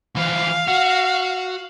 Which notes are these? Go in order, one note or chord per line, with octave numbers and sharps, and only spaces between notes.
E3 F3 F5
F#4